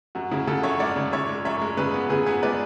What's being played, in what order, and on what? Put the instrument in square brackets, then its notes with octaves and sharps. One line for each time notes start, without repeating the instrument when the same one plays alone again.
[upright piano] F#2 F#4
C#3 E4 G#4
C#3 F#4 A4
F#2 C#5 E5
G#3 D5 F#5
C#3
C#3 C#5 E5
G#3
F#2 C#5 E5
G#3
C#3 G#4 B4
B3
C#3 G#4 B4
B3 G#4 B4
G#3 B4 D5